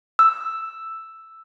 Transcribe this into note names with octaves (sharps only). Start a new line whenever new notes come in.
E6